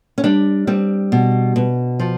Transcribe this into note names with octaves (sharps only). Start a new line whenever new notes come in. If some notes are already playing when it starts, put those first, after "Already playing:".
C#4
G3 D4
G3 C4
B2
B2
F3